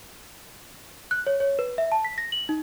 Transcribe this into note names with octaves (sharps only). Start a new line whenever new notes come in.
F#6
C#5
C#5
B4
E5
A5
B6
A#6
F#7
D#4